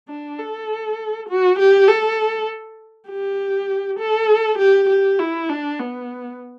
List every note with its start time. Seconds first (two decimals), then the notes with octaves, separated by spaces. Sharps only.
0.08 D4
0.39 A4
1.29 F#4
1.59 G4
1.88 A4
3.09 G4
3.99 A4
4.58 G4
4.89 G4
5.19 E4
5.49 D4
5.79 B3